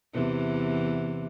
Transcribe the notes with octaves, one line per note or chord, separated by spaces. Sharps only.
E2 C3 E3